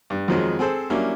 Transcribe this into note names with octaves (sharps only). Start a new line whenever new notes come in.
G2
F2 D#3 F3 F#3 G#3
C4 G#4 A4 C5
F#3 G3 A#3 C#4 D4 E4